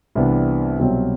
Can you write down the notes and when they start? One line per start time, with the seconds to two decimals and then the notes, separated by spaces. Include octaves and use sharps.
0.15 C2 C3 E3 B3 D4
0.79 C2 B2 F#3 C4